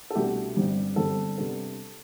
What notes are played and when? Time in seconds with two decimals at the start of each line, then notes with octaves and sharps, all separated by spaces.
0.10 A4
0.15 C2 B2 A3 D4 G4
0.57 G1 G2 D3 G3 C4
0.96 G1 G2 D3 G3 C4 A4
1.37 C3 G3 B3 D4 A4